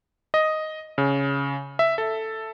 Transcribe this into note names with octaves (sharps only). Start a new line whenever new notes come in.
D#5
C#3
E5
A4